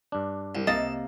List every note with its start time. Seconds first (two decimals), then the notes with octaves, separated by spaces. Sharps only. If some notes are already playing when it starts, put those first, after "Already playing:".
0.12 G2 D4
0.55 C2
0.67 C2 C3 A#3 D#5 A5